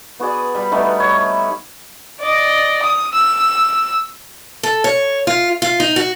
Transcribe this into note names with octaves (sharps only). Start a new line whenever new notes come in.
B3 F#4 G#4 D5
G3 B5
G3 A3 B3 D#4
C#5
D5 D#5
D#6
E6
A4
C#5
F4
F4
D#4
F#4